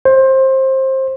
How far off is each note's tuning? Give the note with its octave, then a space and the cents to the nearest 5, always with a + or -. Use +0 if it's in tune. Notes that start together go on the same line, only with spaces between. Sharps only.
C5 +20